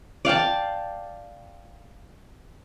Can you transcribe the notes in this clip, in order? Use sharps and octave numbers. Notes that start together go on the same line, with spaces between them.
D5 F5 G5 A5